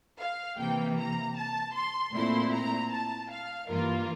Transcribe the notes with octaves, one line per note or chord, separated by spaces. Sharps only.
F5
C3 E3 A#3 G5
A#5
A5
C6
A#2 A3 C4 E4 C6
A#5
A5
F5
G2 E3 A#3 F4 A#4